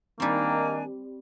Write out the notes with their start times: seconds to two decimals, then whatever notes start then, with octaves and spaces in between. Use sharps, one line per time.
0.20 D#3 G3 A#3 C4 D4 G#5 A#5